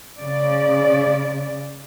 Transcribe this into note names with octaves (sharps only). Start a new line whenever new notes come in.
C#3 D5